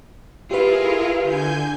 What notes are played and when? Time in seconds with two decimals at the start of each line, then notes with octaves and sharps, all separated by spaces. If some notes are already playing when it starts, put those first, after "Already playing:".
0.51 E4 F4 G4 G#4 A#4 B4
1.21 D3 G#5 G6